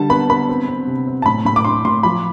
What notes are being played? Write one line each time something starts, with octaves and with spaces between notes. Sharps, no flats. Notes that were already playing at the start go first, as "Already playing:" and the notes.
Already playing: D3 G3 A5
B3 B5
B3 B5
C4
C4
C3
C4
A5
A2 B5
A2 B5
D6
D4 C6
A2 C6
F3 B5